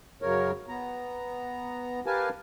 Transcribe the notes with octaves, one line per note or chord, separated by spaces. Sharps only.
F#2 C#3 A#4 C#5
B3 A#5
G4 A#4 B4 F5 G#5 A5